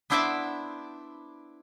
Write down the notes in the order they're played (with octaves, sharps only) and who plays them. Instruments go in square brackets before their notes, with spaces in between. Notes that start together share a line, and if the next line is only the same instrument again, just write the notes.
[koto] B3 D4 E4 C5 D5 E5